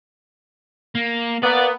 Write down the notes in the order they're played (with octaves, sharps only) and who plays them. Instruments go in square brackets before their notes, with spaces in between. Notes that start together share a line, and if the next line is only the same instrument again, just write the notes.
[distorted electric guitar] A#3
[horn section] A#3 B3 [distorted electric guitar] D5